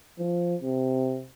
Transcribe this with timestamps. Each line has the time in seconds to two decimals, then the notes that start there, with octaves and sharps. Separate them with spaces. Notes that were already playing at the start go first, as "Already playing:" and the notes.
0.19 F3
0.61 C3